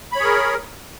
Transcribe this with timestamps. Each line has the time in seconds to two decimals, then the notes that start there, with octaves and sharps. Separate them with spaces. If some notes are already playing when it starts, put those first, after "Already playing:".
0.12 B5
0.16 C#5
0.20 G#4
0.24 A#4